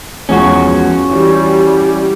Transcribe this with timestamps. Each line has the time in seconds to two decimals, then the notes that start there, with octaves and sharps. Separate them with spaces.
0.29 E2 F3 G#3 C#4 F#4
1.11 E3 G3